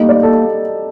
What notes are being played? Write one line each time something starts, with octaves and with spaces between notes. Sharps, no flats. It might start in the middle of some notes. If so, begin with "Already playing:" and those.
Already playing: G3 A3 A#3 D#4
D5
A4